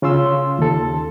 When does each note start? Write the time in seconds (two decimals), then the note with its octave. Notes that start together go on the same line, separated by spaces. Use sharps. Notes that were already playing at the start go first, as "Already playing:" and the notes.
0.02 C#3 C#4 F4 C6 E6
0.59 D#2 A4